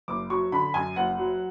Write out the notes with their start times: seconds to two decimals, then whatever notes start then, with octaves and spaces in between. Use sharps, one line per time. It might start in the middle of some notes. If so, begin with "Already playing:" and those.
0.08 F#1 D6
0.30 F#3 C#6
0.52 D3 B5
0.74 F#2 G#5
0.96 F#1 F#5
1.18 F#3